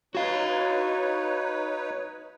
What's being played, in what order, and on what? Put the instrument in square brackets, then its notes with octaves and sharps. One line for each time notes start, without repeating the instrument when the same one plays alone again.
[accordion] D#4 B4 C#5 [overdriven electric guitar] F#4 F5